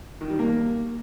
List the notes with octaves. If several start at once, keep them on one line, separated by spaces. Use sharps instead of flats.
D#3
G3
A#3